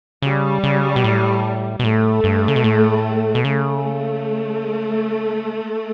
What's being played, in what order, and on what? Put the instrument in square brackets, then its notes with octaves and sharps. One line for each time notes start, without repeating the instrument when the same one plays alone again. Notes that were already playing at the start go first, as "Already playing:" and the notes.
[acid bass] C#3 [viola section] G3
[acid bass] C#3
B2
A2
B2
[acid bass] A2 [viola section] A3
[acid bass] G2
C#3
B2
A2
B2
[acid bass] C#3 [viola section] A3